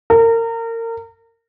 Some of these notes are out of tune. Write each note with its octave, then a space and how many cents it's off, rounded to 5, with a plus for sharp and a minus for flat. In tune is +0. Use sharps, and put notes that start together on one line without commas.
A#4 -30